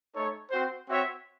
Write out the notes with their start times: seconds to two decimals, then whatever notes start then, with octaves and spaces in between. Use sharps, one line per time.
0.15 A3 D#4 A4 C#5
0.51 C4 F#4 C5
0.88 C4 F#4 C#5 E5